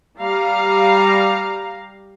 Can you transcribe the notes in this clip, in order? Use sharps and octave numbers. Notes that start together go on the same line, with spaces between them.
G3 F5 A#5